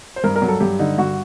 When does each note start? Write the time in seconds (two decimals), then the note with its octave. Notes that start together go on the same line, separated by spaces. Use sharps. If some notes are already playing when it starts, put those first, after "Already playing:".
0.16 C5
0.24 G2 A#4
0.36 A#4
0.42 F#3
0.48 A4
0.60 G2 G4
0.79 D3 D#4
0.98 G2 F#4